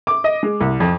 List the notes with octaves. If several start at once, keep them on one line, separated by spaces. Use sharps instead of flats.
D6
D#5
G#3
C2
F2